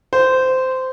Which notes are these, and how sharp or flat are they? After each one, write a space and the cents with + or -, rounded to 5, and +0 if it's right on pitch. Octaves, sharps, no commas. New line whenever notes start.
C5 -15